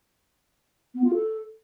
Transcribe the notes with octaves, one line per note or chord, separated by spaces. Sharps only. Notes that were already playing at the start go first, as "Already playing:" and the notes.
B3
F4
A4